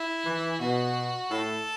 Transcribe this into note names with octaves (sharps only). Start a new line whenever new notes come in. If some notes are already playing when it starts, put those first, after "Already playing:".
Already playing: E4
E3
B2 F#4
A2 A4